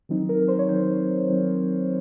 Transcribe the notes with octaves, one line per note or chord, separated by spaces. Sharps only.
D#3 F#3 C4 D#4
A#4
C5
C#5
D#3 F#3 C4 D#4 C5
D#3 F#3 C4 D#4